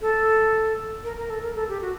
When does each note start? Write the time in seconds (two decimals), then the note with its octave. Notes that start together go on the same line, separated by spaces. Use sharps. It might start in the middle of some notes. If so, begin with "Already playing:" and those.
0.01 A4
1.04 A#4
1.18 A#4
1.30 A4
1.43 A#4
1.56 A4
1.69 G4
1.82 F#4